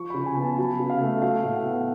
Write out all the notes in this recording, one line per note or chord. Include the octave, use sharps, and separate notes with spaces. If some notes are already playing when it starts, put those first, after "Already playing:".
Already playing: F3 C#6
C#3 B5
G#5
B3
A5
F#3 B5
C#3
F5
A3
F#3 F5
A2
F#5
B3